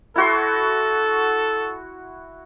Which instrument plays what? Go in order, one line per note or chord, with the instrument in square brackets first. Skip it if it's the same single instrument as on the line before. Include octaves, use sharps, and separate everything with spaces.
[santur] E4 F#4 C6 [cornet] A4